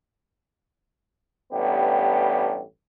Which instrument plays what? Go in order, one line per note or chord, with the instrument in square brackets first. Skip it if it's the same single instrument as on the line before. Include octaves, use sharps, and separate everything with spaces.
[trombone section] A1 G2 B3 G4